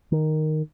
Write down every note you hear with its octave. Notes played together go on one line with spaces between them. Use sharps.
D#3